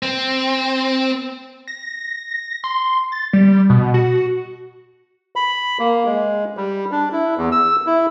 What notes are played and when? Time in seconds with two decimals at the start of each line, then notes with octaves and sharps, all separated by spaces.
0.03 C4
1.68 A#6
2.64 C6
3.12 A6
3.33 G3
3.70 B2
3.94 F#4
5.36 B5
5.79 A#3
6.06 G#3
6.57 G3
6.92 D4
7.12 E4
7.38 E2
7.52 E6
7.87 E4